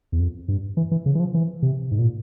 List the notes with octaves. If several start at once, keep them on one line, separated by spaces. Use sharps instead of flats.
E2
F2
G2
E3
E3
C#3
E3
F3
E3
C3
G#2
A#2